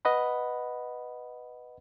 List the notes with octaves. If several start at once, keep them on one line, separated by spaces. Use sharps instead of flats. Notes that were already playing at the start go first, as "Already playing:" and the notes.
B4 D#5 F#5 B5